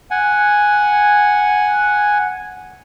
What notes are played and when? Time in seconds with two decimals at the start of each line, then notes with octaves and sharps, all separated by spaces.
0.11 F#5 G#5